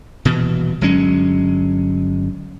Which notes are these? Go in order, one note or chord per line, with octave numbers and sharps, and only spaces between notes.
D#1 B2 E3
G1 F#3 G#3 C#4